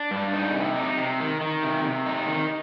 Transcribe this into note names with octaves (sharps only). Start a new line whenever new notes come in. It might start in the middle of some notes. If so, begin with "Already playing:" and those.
Already playing: D4
G2
D#4
C3
D#4
C3
D#3
D#3
C3
C3
D#4
D#3